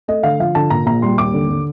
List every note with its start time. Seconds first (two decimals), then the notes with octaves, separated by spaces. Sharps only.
0.08 A3 D#5
0.23 D3 F5
0.40 F3 F5
0.55 D3 A5
0.70 A#2 A#5
0.86 A#1 A#5
1.02 G3 C6
1.18 D#2 D6
1.34 D3
1.50 D3